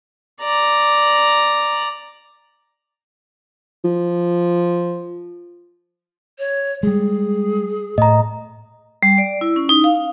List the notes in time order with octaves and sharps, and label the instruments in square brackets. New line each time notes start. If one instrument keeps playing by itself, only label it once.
[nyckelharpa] D5 A#5
[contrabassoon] F3
[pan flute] C#5
[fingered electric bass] G3 G#3 [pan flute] G#4
[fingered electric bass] A2 [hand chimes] D#5 A#5
[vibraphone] G3
D5
E4
C#4
D#4
F5